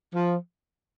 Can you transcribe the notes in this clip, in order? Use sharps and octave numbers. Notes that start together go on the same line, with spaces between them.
F3